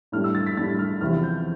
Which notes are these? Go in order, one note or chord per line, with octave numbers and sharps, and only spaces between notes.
A2 G3 D4 F6
E6
A6
B6
A2 G3 D4 A6
F6
E2 C3 F3 C4 E4 F6
G6